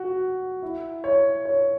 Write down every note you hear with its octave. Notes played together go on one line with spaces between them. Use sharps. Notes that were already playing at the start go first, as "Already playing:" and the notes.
Already playing: F#4
E4
C#5
C#5